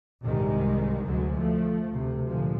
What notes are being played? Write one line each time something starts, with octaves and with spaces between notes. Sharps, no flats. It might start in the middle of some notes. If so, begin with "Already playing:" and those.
C2 G#2 C3 D#3 G3 G#3
D2 D3 F#3 G#3
F3 A3
D2 C3
A#2 D3 F3 G#3